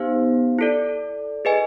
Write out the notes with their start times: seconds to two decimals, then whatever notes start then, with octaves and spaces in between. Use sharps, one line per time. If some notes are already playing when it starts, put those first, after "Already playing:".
Already playing: B3 D#4 G4 C5 F5
0.58 E4 A4 D5
1.45 G#4 B4 D#5 G#5